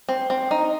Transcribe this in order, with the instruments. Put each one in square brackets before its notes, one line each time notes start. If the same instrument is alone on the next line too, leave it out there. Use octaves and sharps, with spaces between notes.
[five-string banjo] C4
C4
D#4